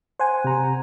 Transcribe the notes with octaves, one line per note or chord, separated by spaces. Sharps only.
C5 F#5 G#5
C3 A#5